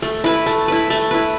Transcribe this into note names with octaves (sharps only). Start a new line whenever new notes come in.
A3
E4 B4
A3
E4 B4
A3
E4 B4